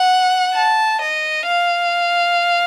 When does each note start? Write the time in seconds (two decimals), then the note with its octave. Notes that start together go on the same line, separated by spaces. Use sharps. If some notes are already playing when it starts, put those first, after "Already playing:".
Already playing: F#5
0.54 A5
1.01 D#5
1.47 F5